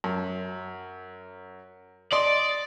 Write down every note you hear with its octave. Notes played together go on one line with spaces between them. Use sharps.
F#2
D5 D#5 C6